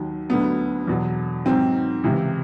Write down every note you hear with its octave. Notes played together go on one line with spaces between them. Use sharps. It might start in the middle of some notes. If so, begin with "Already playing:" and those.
Already playing: D#2 D#3 F#3
D2 D3 F#3 B3
E2 B2 F#3
G#2 D#3 F#3 C4
C#2 C3 E3